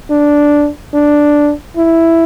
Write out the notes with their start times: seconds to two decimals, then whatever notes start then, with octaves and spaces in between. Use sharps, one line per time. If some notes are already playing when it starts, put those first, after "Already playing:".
0.11 D4
0.94 D4
1.77 E4